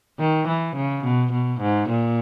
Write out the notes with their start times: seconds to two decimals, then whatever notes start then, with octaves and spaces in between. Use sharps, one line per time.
0.20 D#3
0.47 E3
0.76 C#3
1.04 B2
1.32 B2
1.61 G#2
1.89 A#2